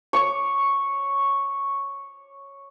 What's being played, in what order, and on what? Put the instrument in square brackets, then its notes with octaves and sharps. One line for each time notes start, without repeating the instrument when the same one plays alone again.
[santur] C#5 D6